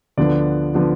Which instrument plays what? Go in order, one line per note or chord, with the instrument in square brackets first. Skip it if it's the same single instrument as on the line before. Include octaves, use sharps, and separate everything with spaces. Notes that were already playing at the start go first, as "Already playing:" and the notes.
[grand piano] D2 D3 F3 B3 D4 D5
D3 F3 B3 D4